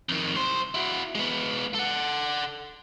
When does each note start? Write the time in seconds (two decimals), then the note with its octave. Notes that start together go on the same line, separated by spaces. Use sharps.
0.09 F2 D#3
0.35 C2 C5
0.74 E4 F#4
1.15 G#3 B3
1.75 A4 F#5